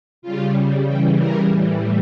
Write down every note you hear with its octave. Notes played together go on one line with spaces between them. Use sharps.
C#3 G3 F4
C#3 E3 G3 G4
A#4
A2 E3 G3